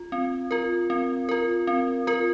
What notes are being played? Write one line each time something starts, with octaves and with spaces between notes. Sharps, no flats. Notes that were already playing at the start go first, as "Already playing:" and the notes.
Already playing: F4
C4
F4 A#4
C4
F4 A#4
C4
F4 A#4